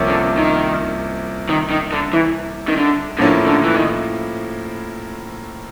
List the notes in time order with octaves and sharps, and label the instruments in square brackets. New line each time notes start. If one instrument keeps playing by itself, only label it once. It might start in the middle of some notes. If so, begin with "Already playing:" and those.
Already playing: [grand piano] C2 C3 F3 A#3 C#4
[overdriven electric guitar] D3
D#3
D#3
D#3
D3
E3
D#3
D3
[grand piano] A2 F3 A#3 C#4 E4 [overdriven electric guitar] D3
[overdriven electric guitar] D3
E3
D#3